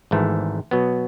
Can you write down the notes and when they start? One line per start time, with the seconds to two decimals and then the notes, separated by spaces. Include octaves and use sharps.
0.11 G#1 G#2 E3 A3
0.71 B2 F#3 B3